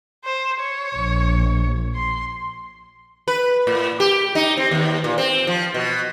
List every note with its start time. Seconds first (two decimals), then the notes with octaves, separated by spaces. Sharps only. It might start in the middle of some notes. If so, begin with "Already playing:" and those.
0.24 C5
0.60 C#5
0.96 A#1
1.95 C6
3.28 B4
3.67 A2
4.00 G4
4.35 D#4
4.57 C4
4.71 D#2
5.04 A#2
5.18 C4
5.47 F3
5.74 B2